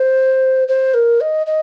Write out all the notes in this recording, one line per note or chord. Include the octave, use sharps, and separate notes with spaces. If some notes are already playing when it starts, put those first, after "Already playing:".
Already playing: C5
C5
A#4
D#5
D#5